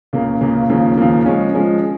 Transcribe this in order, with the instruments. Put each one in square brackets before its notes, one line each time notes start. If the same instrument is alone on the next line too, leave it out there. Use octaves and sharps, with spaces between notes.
[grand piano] C#2 C#3 A#3
C#2 C#3 A#3
D#2 C#3 F3 A#3
D#2 C#3 F3 A#3
F3 G#3 C#4
F3 G#3 C#4